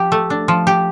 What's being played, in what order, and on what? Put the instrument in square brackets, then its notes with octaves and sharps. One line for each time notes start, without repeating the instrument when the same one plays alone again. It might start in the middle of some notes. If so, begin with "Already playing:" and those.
Already playing: [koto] F3 G4
A3
D4
F3
G4